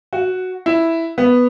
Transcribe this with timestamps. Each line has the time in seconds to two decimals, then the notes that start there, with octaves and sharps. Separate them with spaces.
0.13 F#4
0.66 E4
1.18 B3